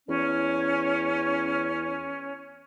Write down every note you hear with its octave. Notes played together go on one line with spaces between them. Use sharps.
E2 C#4